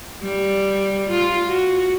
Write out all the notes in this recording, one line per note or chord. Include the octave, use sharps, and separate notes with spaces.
G3
F4
F#4